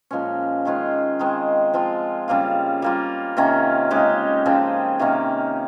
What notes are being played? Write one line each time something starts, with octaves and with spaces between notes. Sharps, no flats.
A#2 F3 G#3 C#4
D#3 G#3 C#4 F4
D#3 G#3 C4
F3 C4 F4
C#3 G3 A#3 F4
G3 A#3 F4
C3 D#3 A#3 C#4
C#3 G#3 D#4 G4
C#3 F3 C4
C3 D#3 A#3 C#4